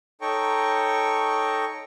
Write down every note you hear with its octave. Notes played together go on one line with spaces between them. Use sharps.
D#4 A4 C#5 G5 A#5 C#6